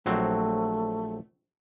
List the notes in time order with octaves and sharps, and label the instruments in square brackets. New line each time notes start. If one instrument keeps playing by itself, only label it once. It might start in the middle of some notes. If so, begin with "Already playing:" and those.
[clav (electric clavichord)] A#1 F#3 C4 [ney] A3